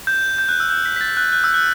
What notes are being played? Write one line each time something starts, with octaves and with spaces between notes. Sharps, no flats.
G6
G6
F#6
E6
G6
B6
B6
A6
F#6
F#6
E6
F#6